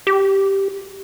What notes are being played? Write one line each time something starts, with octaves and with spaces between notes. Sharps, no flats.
G4